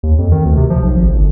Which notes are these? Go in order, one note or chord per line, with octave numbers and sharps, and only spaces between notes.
D#2
F2
D#3
D2
C3
F3
B1
G#1
G1